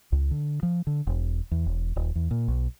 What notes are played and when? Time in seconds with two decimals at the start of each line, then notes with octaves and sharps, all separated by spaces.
0.12 C#2
0.31 D3
0.63 F3
0.87 D3
1.07 E1
1.51 E2
1.66 E1
1.96 D#1
2.15 E2
2.31 A#2
2.48 B1